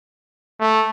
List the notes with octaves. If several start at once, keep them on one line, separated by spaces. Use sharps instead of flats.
A3